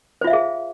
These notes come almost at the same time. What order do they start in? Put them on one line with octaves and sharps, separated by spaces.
C5 F4 E5 F5 G#4